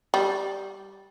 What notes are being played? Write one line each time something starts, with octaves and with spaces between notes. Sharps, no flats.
G3